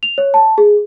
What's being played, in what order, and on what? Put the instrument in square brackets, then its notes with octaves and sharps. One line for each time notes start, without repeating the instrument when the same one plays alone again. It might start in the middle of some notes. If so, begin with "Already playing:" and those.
[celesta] F7
C#5
A5
G#4